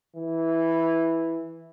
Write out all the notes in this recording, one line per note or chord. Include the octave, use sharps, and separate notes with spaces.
E3